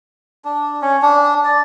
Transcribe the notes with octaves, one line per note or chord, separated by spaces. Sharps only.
D4
C#4
D4
D5